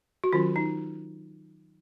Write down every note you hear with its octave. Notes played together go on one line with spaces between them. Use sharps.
F#4
D#3 F#3 C#4 F4
D#4